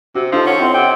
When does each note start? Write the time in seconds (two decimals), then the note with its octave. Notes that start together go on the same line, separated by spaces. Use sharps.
0.15 C3 F#4
0.32 F3 D#4 F4 A4
0.46 C#4 F#5
0.59 C4 E4 F4 D#5
0.74 C3 G5